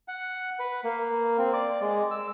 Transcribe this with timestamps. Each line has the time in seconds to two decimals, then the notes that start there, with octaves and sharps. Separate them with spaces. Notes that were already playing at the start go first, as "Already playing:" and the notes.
0.08 F#5
0.59 B4
0.84 A#3
1.38 C4
1.53 D5
1.82 G#3
2.11 E6